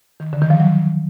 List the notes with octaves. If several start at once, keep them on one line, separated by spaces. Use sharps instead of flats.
D#3
D3
D#3
F3
F#3